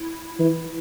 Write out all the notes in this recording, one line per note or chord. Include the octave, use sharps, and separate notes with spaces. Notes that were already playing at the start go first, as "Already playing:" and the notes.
Already playing: E4
E3